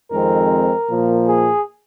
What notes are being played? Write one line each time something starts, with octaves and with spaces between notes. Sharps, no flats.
F2 D#3 G#3 C4 A#4
A#2 F3 A#3
G#4